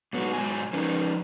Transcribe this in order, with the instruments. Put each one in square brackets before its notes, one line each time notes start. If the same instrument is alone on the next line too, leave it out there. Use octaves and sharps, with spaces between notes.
[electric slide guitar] G#2 F#3 B3 F#4
G#2 B2 F#3 G#3 G#5
F3 C#4 D#4 B4